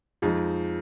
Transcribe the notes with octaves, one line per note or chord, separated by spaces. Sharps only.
F2 F3 G#3 D#4